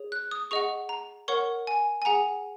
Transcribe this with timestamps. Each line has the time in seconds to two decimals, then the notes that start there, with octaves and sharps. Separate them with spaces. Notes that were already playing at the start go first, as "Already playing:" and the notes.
Already playing: G#4 C#5
0.12 F#6
0.31 D#6
0.51 G#4 D#5 F#5 C#6
0.89 A#5
1.28 A#4 C#5 F#5 C#6
1.67 G#5
2.02 G#5
2.05 G#4 F#5 A#5